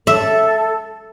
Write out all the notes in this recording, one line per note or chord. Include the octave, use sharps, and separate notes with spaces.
A4 E5